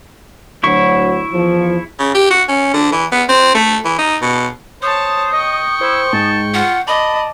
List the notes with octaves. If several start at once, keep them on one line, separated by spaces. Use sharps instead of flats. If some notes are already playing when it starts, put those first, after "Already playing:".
D2 D3 F#3 E4 C#6
E2 F3
C#3
G4
F#4
C#4
D3
E3
B3
C4
A3
E3
D#4
B2
C5 C#5 A5 D#6
D#5 G5 C#6
E4 C5
G#2 A5
F4 F#5
D5 D#5 A5 B5